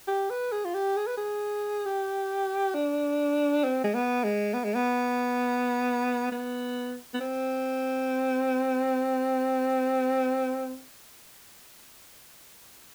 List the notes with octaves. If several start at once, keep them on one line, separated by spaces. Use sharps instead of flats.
G4
B4
G#4
F4
G4
G#4
B4
G#4
G4
D4
C4
G#3
B3
G#3
B3
G#3
B3
B3
B3
C4